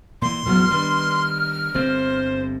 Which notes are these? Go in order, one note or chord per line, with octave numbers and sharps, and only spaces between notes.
A#2 E3 C6
A1 E2 A2 F#3 B3 F6
D#3 G3 D4 B4
G1 G2 C4 C5